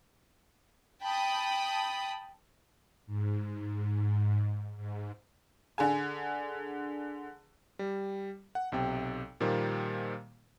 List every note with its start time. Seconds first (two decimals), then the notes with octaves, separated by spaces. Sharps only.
1.02 G5 A5 B5 D#6
3.06 G#2
4.77 G#2
5.78 D3 G#4 G#5
7.79 G3
8.55 F#5
8.72 B1 C3 G5
9.40 A#2 D#3 F3 G3 A#3